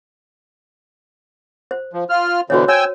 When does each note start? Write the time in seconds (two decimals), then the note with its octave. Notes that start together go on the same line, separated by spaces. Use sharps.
1.71 C5
1.93 F3
2.10 F4 F6
2.50 B2 D3 E3 F#4 C5 C#5
2.68 C#5 G5 G#5 E6